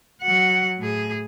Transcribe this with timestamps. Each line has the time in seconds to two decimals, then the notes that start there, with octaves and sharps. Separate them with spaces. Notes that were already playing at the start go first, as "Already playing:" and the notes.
0.22 F#3 F#5
0.78 A2 G#4